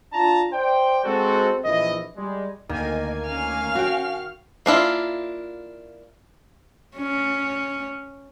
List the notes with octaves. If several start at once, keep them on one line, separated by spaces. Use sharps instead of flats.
D4 F4 A5 A#5
C5 D5 G5
G#3 C4 F#4 A4
A#1 D#2 E3 E4 D#5
G3 G#3
D2 D#3 A#3 D#5 G#5
C#4 F5 F6
F#4 G5
A#3 D4 E4 F4
C#4